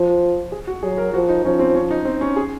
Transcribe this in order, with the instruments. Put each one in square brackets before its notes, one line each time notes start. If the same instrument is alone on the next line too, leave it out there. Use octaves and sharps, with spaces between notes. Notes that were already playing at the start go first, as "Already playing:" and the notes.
Already playing: [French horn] F3
[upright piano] G#4
F#4
[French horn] F#3 [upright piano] G#4
[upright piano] A#4
[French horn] F3 [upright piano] F#4
[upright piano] D#4
[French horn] F3 [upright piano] C#4
[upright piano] C4
C#4
D#4
C4
C#4
G#4